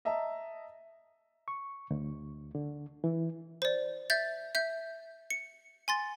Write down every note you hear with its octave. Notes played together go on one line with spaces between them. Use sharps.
D#5 E5 A5 A#5
C#6
D2
D3
E3
C5 D5
E5 G6 A6
E5 G6
C#7
G#5 C6 A6